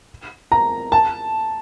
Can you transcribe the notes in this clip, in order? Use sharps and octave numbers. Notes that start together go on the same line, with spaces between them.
A#5
A5